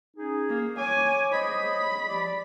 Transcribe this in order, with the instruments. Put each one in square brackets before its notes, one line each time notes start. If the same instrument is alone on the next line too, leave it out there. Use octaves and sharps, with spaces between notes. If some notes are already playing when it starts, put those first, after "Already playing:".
[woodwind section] C#4 D#4 G#4
[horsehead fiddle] A#3
[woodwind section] C#5 D6 [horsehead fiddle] G#5
[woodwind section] C5 C#5 D#5 [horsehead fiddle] B5
[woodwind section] F3 G4 D5